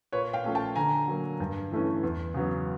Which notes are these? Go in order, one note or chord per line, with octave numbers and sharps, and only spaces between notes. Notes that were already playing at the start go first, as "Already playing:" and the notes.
A#2 B4 C#5
F5 G5
F3 A3 C#4
G5 A5
D3 G#5 A#5
F#3 A#3
G2
E3 A3 C#4
E2
C#3 F#3 B3